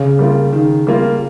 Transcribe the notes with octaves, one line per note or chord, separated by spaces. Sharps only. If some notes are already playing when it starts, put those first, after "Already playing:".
Already playing: C#3
G3 A#3 F4
D#3
G3 A#3 F4